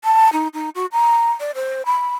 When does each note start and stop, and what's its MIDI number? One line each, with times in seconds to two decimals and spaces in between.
0.04 0.31 81
0.33 0.48 63
0.54 0.69 63
0.75 0.86 66
0.92 1.30 82
1.40 1.51 74
1.55 1.82 72
1.86 2.15 83